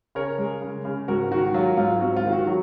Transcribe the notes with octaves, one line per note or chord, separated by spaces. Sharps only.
C#3 A#4 C#5
G#3
C#3
C#3
G#2 F#4 A#4
D#3 F#4
F#3 F4
G#2 F4
C4 F#4
F4
D#3
F#4
F#3 F#4